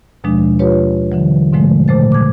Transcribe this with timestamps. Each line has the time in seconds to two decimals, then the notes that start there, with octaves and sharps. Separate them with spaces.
0.24 D#2 B2 F3 G#3 D4
0.59 F4 G4 B4 C#5
1.12 D3 E3 F#3
1.52 G#2 B2 D3 F3 G#3 A3
1.88 A#2 C#3 A3 C5 A6
2.12 D6 G#6